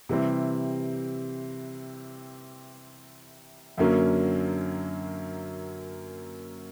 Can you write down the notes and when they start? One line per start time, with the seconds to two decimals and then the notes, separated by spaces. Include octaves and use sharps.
0.09 C3 E3 G3 C4
3.78 F#2 D3 F#3 A#3 C#4